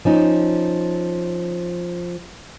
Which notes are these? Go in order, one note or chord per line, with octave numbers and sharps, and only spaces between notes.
F3 C#4 D#4